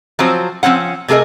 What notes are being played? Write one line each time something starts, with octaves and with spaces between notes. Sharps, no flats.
F3 F#3 C4 C5
F3 A3 C4 C#4 F#5
C3 A3 G#4 A#4 D#5